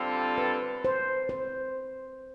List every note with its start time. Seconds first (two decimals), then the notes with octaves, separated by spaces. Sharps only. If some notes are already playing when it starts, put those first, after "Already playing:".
Already playing: D3 G3 C4 F4 A4
0.38 B4
0.85 C5
1.29 C5